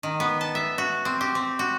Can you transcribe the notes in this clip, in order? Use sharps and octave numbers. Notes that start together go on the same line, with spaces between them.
D#3
B3
A5
E5
F#4
C4
G4
C4
F#4